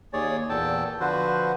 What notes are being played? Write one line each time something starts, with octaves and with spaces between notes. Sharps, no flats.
D#2 G#4 C#5 D5
E2 A#2 A4 G5 A5
D3 F3 F#4 B4 C5